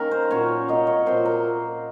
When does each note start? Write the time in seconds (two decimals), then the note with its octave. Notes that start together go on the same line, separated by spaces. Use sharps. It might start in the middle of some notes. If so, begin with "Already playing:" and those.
Already playing: D#3 A#3 C#4 A#4
0.11 C5
0.31 A#2 F#3 C#4 C#5
0.68 C3 F#3 A#3 D#5
0.87 C#5
1.06 A#2 F3 C4 C5
1.25 A#4